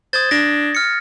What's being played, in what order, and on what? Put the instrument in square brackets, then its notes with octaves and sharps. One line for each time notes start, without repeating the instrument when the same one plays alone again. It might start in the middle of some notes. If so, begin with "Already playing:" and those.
[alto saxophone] C5 [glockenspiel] D#6 G#6 A6
[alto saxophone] D4 [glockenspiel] A#6
[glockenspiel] F6 C#7